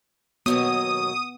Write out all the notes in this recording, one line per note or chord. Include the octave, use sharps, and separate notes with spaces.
D#2 B2 F#3 B3 D#6